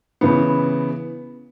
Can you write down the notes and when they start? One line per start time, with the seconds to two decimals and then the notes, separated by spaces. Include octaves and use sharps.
0.21 C#3 E3 B3